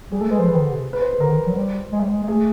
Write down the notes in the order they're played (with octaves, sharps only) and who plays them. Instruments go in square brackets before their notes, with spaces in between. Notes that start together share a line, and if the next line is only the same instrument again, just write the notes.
[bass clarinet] G3 [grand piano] G#4
[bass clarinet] A3 [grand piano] A4
[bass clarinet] G#3 [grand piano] B4
[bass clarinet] F3 [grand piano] C5
[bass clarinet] E3 [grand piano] B4
[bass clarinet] D#3
D3
C3
[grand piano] B4
C5
B4
[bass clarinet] D3 [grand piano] A#4
[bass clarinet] D#3
E3
F#3
[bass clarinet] G3 [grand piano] C5
[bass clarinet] G#3
G3
G#3
G#3
[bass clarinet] A3 [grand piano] G#4